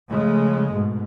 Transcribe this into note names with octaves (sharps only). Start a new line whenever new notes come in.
C#3 F3 G#3 A3
G#2 B2